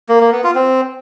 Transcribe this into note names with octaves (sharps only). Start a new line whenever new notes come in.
A#3
A#3
B3
F4
C4